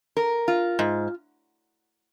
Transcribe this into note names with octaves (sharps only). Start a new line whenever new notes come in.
A#4
F4
G#2